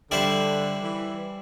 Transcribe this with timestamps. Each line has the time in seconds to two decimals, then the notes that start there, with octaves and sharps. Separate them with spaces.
0.10 D3 G3 E4 C5
0.82 E3